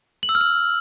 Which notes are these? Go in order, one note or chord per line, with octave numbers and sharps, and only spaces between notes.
F#7
E6
F6
F#7